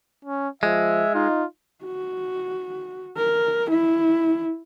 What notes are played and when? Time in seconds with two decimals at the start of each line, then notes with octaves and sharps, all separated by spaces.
0.25 C#4
0.63 F3 G#3 E5
1.15 D#4 F4
1.84 F#4
3.17 A#4
3.70 E4